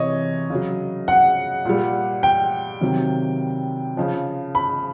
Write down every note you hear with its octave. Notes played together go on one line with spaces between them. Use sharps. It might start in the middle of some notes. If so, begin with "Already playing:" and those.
Already playing: C3 E3 C#5 D#5
C#3 F#3
F#5
A#2 G3
G5
C3 D#3 F#3
C#3 F3
B5